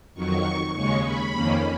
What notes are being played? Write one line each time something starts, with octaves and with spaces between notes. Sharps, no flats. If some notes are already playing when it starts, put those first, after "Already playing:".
F2 D#3 F#3 C#6
D#2 C#3 G#3 C#4 C#6
B5
F2 D#3 A#3 C#4